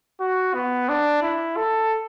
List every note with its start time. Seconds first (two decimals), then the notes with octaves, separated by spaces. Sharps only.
0.20 F#4
0.54 B3
0.89 D4
1.22 E4
1.56 A4